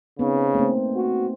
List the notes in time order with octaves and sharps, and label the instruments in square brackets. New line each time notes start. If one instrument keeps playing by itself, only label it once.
[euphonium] C#3 [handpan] B3 C4 D#4
[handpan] A3 A#3 C4
[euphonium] F#4